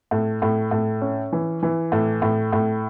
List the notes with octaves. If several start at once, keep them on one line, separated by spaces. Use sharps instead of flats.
A2
A2
A2
C#4
E3
E3
A2
A2
A2